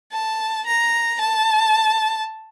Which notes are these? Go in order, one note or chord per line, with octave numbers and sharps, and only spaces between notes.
A5
A#5
A5